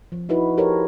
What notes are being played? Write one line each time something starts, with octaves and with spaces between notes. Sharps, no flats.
F3
D#4 E4 F#4 B4
G4 A4 A#4 C5 C#5